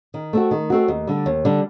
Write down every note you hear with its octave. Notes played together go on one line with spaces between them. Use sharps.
D#3
A3 C4 F#4
D#3
A3 C4 F#4
D#2
D3 G3
D#2
D3 G3